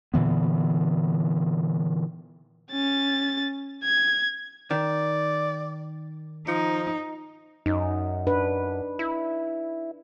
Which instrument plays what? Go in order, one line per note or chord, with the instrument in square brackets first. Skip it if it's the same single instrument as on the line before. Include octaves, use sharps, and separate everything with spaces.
[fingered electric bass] A#2 D3 E3 B3
[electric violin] C#4 A6
G#6
[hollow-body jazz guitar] D#3 [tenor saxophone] D5
[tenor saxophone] F3 [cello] D#4
[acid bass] F#2 [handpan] D#4
[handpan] D4 B4
[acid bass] E4